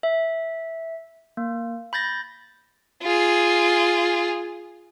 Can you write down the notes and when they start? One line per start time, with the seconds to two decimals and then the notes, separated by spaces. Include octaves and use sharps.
0.03 E5
1.37 A#3
1.93 B5 G6 A6 A#6
3.02 F4 G#4